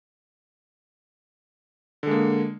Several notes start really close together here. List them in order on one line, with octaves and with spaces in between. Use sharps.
D3 G#3 A#3